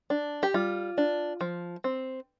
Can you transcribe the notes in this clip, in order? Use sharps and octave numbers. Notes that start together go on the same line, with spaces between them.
D4
G4
G3 F4
D4
F3
C4